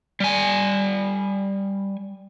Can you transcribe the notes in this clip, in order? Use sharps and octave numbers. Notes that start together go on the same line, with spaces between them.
G3 G#5